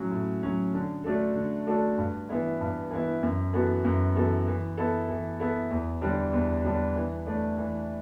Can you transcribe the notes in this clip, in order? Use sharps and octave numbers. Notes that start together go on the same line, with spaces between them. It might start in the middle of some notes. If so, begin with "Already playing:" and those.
Already playing: A2 F#3 C#4
A2
F#3 C#4
D3
A3 D4 F#4 A4
D3
A3 D4 F#4 A4
G2
E3 B3 E4
G2
E3 B3 E4
F#2
E3 B3 F#4 A4
F#2
E3 B3 F#4 A4
E3
B3 E4 A4
E3
B3 E4 A4
E2
D3 G3 D4
E2
D3 G3 D4
E3
A3 D4
E3